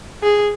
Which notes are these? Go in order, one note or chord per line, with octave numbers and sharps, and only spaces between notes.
G#4